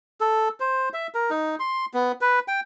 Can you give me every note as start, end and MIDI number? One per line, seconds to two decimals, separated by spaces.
0.20 0.49 69
0.60 0.89 72
0.94 1.07 76
1.14 1.30 70
1.30 1.55 63
1.60 1.86 84
1.94 2.12 59
2.21 2.39 71
2.48 2.60 79